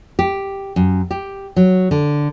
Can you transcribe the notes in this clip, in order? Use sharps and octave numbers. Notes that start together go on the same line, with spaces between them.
G4
F#2
G4
F#3
D3